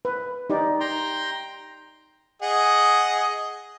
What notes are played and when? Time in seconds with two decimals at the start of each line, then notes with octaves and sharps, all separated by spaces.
0.05 B4
0.50 D#4 G4 D5
0.80 G5 A#5 C6
2.42 G#4 D#5 F#5